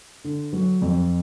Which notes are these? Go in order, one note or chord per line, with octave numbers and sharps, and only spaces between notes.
D3
F#3
F2